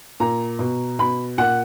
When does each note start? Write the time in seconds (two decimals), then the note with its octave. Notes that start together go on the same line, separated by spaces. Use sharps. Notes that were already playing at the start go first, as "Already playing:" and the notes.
0.20 A#2 A#5
0.59 B2
0.99 B2 B5
1.38 A#2 F#5